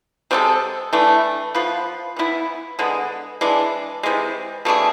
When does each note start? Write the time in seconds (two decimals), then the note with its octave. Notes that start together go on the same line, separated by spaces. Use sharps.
0.31 C3 G#3 D4 A4
0.93 E3 A3 D4
1.54 F3 B3 F4 B4
2.16 E3 B3 E4
2.79 D3 G#3 B3
3.41 E3 G#3 D4
4.03 C3 E3 G#3
4.65 B2 A3 D4 G#4